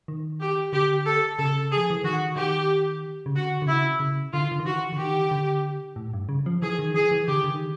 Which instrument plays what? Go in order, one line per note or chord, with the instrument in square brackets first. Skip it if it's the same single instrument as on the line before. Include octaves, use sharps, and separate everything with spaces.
[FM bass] D#3
[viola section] G4
[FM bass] D3 [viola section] G4
[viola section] A4
[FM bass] C#3 [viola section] A4
[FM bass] F3 [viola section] G#4
[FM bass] E3
[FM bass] D#3 [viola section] F#4
[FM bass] D#3 [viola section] G4
[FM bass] C#3
[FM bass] D3 [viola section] F#4
[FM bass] D3
[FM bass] C#3 [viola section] E4
[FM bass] C#3
[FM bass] D3 [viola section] F4
[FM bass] D3
D#3
[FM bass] E3 [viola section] F#4
[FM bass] D3
[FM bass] D#3 [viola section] G4
[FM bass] D3
A2
G2
C#3
F3
[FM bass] E3 [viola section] G#4
[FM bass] D#3
[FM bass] E3 [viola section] G#4
[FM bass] E3
[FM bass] D3 [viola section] G4
[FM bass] D3
D#3